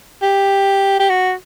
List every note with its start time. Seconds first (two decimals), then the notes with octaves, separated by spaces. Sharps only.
0.22 G4
0.99 G4
1.09 F#4